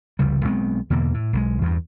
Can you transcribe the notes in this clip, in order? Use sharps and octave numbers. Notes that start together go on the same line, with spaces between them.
F1 C#2 C#3 G3
B1 G#3 B3 C4
E2 B2 D3 A#3
A2
B1 D#3 G#3
E2 G2